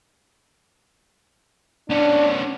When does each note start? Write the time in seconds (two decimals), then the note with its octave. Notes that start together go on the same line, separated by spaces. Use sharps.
1.90 B3 C#4 D4